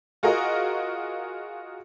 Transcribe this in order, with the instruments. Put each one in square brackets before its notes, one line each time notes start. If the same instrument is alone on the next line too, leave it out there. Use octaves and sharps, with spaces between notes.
[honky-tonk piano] F4 F#4 G#4 A#4 D#5